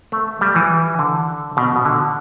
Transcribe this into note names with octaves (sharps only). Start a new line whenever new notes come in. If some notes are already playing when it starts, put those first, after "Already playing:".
A3
G3
E3
D3
B2
B2
D3